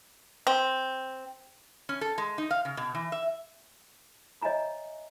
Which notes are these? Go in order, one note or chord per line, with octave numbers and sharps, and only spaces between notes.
C4
C#4
A4
G#3
D#4
F5
C#3
B2
E3
E5
C#5 D#5 E5 G#5 A#5 B5